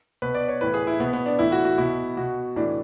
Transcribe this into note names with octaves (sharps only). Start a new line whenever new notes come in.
B2 B4
D5
C#5
A2 E3 B4
G#4
E4
B2 B3
B3
D4
A2 E3 E4
F#4
F#4
B2 E4
B2 F#4
A2 E3 D4